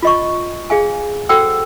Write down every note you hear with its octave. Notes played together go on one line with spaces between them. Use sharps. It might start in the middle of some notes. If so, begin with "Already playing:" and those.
F4 D#5 C#6
G#4 F5 G#5
F#4 A4 C5 F#5 G5 E6